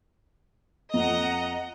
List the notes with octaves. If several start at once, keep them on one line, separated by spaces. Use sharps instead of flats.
F2 D#5 F#5 A#5